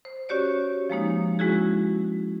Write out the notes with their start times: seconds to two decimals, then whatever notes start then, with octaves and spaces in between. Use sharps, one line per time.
0.05 C5
0.29 C#4 F#4 G4 C#5 D5
0.90 F3 G#3 A#3 D#4
1.39 G#3 C#4 E4 F#4 G#4